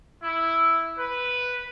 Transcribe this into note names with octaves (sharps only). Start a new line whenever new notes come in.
E4
B4